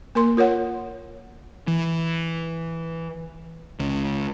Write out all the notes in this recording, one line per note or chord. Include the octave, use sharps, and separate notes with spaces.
A#3 A#4 C6
F4 A#4 C#5 F#5
E3
C#2